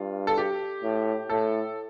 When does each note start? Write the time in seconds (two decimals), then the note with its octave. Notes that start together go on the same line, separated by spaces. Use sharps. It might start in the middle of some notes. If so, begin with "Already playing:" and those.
Already playing: G2 F4
0.27 A4
0.38 G4
0.83 A2
1.30 A2 A4